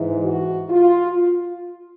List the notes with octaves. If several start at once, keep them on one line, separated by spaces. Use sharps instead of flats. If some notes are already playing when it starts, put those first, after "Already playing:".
Already playing: G#2 E3
F#4
F4